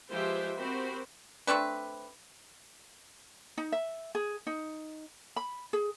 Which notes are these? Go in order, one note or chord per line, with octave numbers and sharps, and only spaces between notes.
F3 G#3 G4 B4 C5 E5
C4 F#4 G4 A#4 C5 B5
A3 C4 D4 B4
D#4
E5
G#4
D#4
B5
G#4